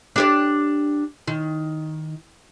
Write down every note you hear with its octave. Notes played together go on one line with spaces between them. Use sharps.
D4 G4 D5
D#3